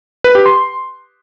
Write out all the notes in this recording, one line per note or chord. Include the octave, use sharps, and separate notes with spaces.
B4
G4
C6